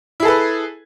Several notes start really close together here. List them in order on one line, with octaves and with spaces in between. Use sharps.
E4 G#4 A4 B4